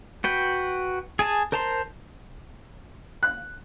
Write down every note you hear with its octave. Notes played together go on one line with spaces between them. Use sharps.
F#4 B4 G5
G#4 G#5 A5
A#4 C5 A5 A#5 C6
F#6